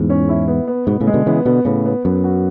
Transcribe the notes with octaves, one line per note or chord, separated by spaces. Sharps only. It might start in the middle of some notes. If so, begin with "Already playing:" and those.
Already playing: E2 G#2
C#4
E4
B3
B3
G#2 B2 B3
A2 C#3
G#3
B2 D3
C#3 E3 B3
B2 D3 B3
A2 C#3 B3
B3
F#2 B3
F#4